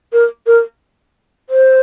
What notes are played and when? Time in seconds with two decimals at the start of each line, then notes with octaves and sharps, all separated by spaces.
0.13 A#4
0.47 A#4
1.50 C5